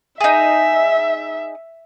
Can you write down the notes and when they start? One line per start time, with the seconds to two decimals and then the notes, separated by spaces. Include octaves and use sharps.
0.21 D#4 G#4 E5